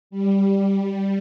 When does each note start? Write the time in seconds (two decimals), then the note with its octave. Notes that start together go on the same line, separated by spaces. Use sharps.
0.11 G3